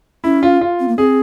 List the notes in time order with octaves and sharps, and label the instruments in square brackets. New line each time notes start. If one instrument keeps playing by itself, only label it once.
[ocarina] C#4 [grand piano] E4
[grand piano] F4
F4
[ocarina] C4
A#3
[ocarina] C4 [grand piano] G#4